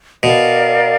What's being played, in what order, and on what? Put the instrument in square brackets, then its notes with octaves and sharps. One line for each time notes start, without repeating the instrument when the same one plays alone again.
[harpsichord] B2 [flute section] A#4 D5 F5